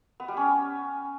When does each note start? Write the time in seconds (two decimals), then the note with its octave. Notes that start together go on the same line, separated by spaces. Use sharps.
0.20 B3
0.28 G3
0.37 C#4